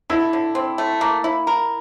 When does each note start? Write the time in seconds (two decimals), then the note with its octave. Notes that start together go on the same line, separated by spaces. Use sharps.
0.10 D3 E4
0.33 D3
0.55 C4
0.78 A3
1.01 A#3
1.24 E4
1.47 A#4